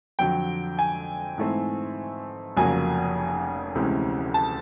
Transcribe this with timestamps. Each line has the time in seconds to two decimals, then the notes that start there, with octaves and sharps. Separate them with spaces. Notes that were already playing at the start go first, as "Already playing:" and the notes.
0.19 F2 D3 F#3 G5
0.79 G#5
1.38 G#2 E3 A3 C4
2.56 F1 F2 C#3 F#3 A#3 G#5
3.75 D2 C3 E3 G#3 C#4
4.34 A5